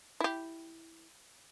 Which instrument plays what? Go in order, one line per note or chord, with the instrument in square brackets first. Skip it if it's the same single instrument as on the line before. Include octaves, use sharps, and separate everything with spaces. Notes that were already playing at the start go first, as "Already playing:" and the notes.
[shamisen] E4 G4